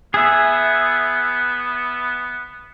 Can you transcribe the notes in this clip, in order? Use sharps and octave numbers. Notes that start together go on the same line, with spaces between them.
B3 G#4 E5